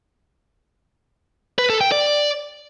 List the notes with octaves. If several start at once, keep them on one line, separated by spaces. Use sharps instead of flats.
B4
A4
G5
D5